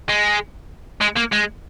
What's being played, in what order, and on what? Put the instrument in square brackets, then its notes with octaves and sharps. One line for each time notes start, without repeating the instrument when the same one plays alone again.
[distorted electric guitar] G#3
G#3
A#3
G#3